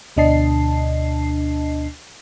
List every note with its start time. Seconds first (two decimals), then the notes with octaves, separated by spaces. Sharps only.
0.17 D2 B2 D4 D#5 A5 C7